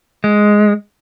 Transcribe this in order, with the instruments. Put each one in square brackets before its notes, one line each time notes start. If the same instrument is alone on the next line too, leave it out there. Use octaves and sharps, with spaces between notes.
[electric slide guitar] G#3